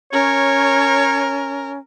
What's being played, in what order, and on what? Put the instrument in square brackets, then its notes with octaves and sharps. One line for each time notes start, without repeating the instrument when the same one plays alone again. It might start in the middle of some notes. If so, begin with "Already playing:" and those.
[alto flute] C#4 [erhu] A#4 [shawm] C#5